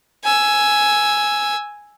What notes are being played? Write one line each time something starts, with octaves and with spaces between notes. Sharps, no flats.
G#5 E6